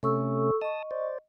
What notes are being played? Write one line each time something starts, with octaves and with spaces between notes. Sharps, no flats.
C3 A3 C#4 A4 C#6 E6
D#5 A5 C#6 D#6
C5 D5